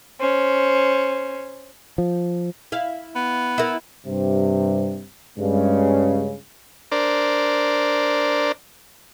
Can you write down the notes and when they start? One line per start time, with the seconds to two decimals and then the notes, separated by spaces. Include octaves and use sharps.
0.20 C#4 C5
1.98 F3
2.72 E4 F5
3.16 B3
3.58 E4 A#4
4.07 G2 C3
5.38 G2 C#3 G#3
6.92 D4 A#4 C5 D5